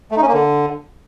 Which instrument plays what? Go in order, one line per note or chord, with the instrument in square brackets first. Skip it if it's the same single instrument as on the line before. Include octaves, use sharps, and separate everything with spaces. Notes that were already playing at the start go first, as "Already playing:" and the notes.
[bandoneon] A3
D#4
C#4
A#3
D3